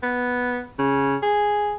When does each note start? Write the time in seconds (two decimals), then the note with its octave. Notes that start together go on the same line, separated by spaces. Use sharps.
0.03 B3
0.79 C#3
1.22 G#4